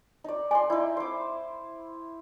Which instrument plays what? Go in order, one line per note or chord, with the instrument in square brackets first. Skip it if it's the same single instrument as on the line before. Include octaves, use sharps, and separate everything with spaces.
[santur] D#4 D5
[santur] D5 C6 [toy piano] G#5
[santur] D#4 E4 [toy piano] D5
[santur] C5 D6